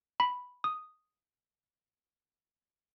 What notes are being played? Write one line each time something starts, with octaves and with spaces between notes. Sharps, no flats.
B5
D#6